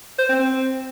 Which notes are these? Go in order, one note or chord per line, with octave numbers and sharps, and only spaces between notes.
C5
C4
C4